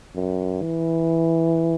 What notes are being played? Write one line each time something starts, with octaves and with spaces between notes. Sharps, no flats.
F#2
E3